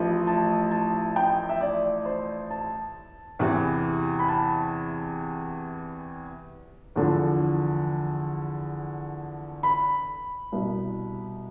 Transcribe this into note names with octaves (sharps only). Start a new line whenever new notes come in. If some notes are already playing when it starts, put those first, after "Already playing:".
Already playing: A1 A2 F3
A5
A5
G5
E5
D5
C5
A5
E2 C3 E3
B5
A5
E2 D3 F3
B5
C2 B2